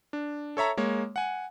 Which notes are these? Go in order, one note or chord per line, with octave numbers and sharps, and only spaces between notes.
D4
A4 C#5 E5 A#5
G#3 A#3 C#5
F#5 G#5